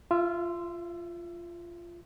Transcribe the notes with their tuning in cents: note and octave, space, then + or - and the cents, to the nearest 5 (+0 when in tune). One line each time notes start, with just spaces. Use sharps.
F4 -15 E5 +20